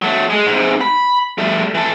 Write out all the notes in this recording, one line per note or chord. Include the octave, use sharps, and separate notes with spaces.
F#3 A3
G#3
G#2 C3
B5
G3 A3
E3 A4